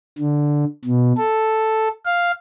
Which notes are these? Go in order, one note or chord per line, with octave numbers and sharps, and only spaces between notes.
D3
B2
A4
F5